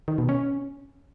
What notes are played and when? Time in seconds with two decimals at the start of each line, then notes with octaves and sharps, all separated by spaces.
0.08 D#3
0.18 B2
0.29 C#4